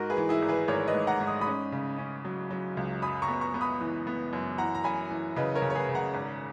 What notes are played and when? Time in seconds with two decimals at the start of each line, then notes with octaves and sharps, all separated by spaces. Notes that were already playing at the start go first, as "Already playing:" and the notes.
Already playing: G#2 F#4 A#4
0.10 G#4 B4
0.17 E3
0.29 E4 G#4
0.42 G#1
0.48 G#4 B4
0.68 G#1 A#4 C#5
0.88 B4 D#5
0.94 G#2
1.07 F#5 A#5
1.20 G#2
1.27 D#6
1.41 B5 D#6
1.47 C#4
1.72 C#3
1.98 C#4
2.25 F#3
2.51 F#3
2.77 C#2
3.02 F#2 B5 D#6
3.22 A#5 C#6
3.28 B3
3.41 A#5 C#6
3.54 B3
3.61 B5 D#6
3.80 E3
4.07 B3
4.33 F#2
4.58 E3 F#5 A#5
4.75 A#5
4.84 F#2 G#5 B5
5.10 E3
5.36 C#3 B4 D#5
5.55 A#4 C#5
5.62 C#3
5.70 C#5
5.75 G#4 B4
5.89 C#3
5.95 F#5 A#5
6.14 G#1